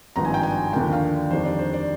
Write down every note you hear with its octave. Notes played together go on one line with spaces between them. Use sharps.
G#1 G2 F3 A#5
G#5
G5
G#5
D#2 D3 F3 A#3 G5
F5
F2 D#3 G3 D4 C5
D5
C5
D5